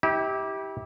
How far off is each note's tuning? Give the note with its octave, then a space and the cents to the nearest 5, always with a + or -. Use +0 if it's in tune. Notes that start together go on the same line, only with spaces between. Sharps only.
E4 -35 G4 +0